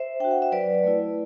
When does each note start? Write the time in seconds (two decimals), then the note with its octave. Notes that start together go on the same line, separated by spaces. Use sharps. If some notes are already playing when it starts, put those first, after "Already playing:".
Already playing: C5 E5
0.20 D4 F#4 G5
0.31 F#5
0.42 E5
0.52 F#3 B4 D5
0.84 A3 E4